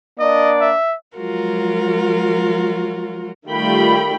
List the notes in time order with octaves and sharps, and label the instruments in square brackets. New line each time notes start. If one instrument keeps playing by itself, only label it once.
[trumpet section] A#3 D4 D5 [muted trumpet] D#5
[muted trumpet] E5
[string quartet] F3 F#3 G#3 F4 F#4 A#4
[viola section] D#3 G3 A3 F4 G5 B5